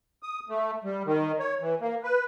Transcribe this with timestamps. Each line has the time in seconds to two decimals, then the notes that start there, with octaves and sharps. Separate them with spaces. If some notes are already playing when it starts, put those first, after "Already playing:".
0.23 D#6
0.49 A3
0.84 G3
1.06 D#3
1.39 C#5
1.61 E3
1.81 A#3
2.03 B4